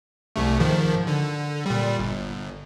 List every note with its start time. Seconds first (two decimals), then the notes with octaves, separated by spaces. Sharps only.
0.36 C2 C3 A3
0.60 G#2 D#3 F3
1.07 D3
1.66 A#2 G3
1.99 G1